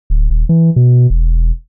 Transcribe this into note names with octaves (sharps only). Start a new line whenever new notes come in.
D1
D#1
E3
B2
E1